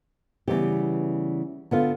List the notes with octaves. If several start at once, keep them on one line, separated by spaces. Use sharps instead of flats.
C#3 E3 G3 B3 G4
D3 B3 F4